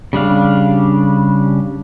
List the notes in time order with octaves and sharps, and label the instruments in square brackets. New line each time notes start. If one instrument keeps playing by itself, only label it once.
[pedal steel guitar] C#3 G3 D4 F5